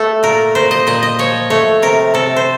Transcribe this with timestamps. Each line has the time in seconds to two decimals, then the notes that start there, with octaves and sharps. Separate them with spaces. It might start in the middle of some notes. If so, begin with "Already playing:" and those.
Already playing: A3 A4
0.23 A#2 A#4
0.55 A#2 C5
0.71 D#5
0.87 A#2 D#5
1.03 D#5
1.19 F3 C#5
1.50 A3 C#5
1.82 C3 A#4
2.14 C3 A4
2.36 C5